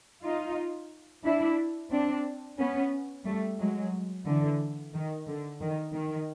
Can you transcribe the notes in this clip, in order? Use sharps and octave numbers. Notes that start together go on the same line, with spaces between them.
D#4 F4
D4 E4
C4 D4
B3 C#4
G3 A3
F#3 G#3
D3 E3
D#3
D3
D#3
D#3